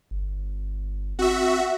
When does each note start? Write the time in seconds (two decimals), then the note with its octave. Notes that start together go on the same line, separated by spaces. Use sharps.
0.11 G1
1.19 C4 F#4 E5